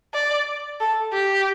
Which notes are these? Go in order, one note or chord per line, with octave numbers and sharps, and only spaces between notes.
D5
A4
G4